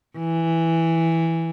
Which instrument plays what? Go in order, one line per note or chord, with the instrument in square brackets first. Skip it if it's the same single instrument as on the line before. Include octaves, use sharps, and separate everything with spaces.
[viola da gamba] E3